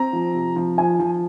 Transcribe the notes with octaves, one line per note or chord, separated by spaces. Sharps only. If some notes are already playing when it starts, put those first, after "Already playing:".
Already playing: C4 A#5
F3
C3
F3
F3 G#5
F3